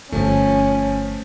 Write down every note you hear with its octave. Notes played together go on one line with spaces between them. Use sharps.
G1 F3 A3 C#4